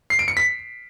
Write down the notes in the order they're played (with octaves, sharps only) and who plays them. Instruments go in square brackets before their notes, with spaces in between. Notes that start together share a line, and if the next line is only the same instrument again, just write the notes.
[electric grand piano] C7
D7
C#7
B6